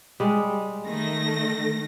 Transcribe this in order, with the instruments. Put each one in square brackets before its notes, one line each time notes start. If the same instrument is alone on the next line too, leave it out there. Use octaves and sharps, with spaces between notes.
[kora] G3 G#3
[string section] D#3 A3 A#6